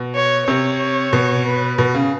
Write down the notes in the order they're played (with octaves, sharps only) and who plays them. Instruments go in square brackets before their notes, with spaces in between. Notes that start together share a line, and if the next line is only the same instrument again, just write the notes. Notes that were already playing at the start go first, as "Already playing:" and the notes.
Already playing: [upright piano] B2
[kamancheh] C#5
[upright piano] C3 [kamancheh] C#5
[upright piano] B2
[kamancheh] B4
[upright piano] B2
C#3